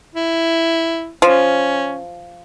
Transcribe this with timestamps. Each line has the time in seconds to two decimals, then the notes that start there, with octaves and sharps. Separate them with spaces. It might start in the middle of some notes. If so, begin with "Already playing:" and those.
0.15 E4
1.22 F3 C#4